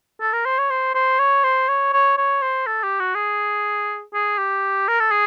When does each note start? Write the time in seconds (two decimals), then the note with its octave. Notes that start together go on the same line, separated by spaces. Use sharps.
0.21 A4
0.33 A#4
0.45 C5
0.58 C#5
0.70 C5
0.95 C5
1.19 C#5
1.44 C5
1.68 C#5
1.93 C#5
2.18 C#5
2.42 C5
2.66 A4
2.83 G4
2.99 F#4
3.15 G#4
4.14 G#4
4.38 G4
4.88 A#4
5.00 A4
5.11 G#4